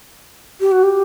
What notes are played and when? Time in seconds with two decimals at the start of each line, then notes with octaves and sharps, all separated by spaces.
0.60 G4
0.72 F#4
0.83 G4